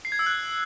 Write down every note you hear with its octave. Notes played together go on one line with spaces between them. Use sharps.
C7
G#6
E6
F#6